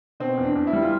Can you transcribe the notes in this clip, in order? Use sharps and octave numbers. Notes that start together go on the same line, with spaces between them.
B2 C4
E2
D4
E2
E4
G3
F4